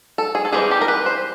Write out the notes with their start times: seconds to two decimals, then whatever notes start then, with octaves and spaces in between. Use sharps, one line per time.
0.18 A4
0.35 G#4
0.45 A4
0.52 E3 G3 C4 D#4 G#4
0.71 G4
0.81 A#4
0.88 B4
1.06 C5